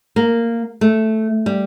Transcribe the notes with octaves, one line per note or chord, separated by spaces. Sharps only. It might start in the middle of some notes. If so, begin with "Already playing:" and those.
A#3
A3
G3